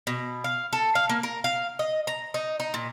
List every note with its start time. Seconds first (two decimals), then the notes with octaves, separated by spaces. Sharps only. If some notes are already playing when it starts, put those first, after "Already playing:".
0.07 B2
0.44 F5
0.73 A4
0.95 F5
1.09 A#3
1.23 A#4
1.44 F5
1.79 D#5
2.07 A#5
2.34 D#4
2.60 D#4
2.74 A#2